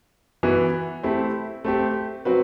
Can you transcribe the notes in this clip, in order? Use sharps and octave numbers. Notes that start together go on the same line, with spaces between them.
E3 B3 F#4 B4
A3 C4 E4 G4
A3 C4 G4
F#3 C4 F#4 B4